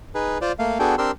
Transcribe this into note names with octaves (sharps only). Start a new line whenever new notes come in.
D#4 G#4 B4
F4 C5 D5
A3 A#3 F5
B3 D4 F#4 G#4 A4 G5
C4 D4 G4 A#4 C6 E6